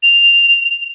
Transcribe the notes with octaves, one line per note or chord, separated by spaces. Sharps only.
F7